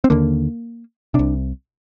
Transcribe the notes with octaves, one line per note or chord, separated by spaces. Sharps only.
C4
D#2 D3 A#3
C2 C3 D4